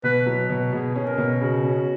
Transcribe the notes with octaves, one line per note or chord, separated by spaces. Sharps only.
B2 B4
F#3
B2
B2 G#4
C#4 G#4
A#4
B2
C#3 F#4
C#4